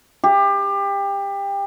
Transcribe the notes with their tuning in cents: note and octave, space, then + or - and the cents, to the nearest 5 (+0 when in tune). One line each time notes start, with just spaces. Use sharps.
G4 +25